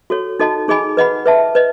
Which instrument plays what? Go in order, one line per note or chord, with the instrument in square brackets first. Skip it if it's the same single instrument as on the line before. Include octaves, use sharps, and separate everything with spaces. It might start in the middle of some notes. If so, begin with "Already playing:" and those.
[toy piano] F#4 A4 C#5
D#4 F#4 A4 D#5 A5
D#4 G#4 D#5 G#5 B5
B4 D#5 F#5 B5
B4 E5 A5
B4 D#5